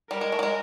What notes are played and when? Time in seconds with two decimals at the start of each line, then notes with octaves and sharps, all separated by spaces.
0.11 G3 A#4
0.21 G#3
0.32 A3
0.39 G3
0.43 G#3